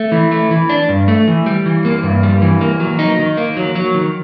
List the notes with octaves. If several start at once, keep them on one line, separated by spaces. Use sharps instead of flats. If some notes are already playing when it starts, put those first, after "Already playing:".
Already playing: A3
E3
A3
E3
D4
G2
A3
E3
G3
E3
A#3
G2
G3
E3
A#3
F#3
D#4
D#3
A#3
F#3
F#3
D#3